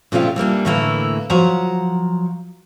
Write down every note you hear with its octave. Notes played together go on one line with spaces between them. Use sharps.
A#2 C#3 F3 A3 F4 G4
E3 G3 A#3 D4
A2 D3 E3 A3 A#3 E4
F3 F#3 F#5 A#5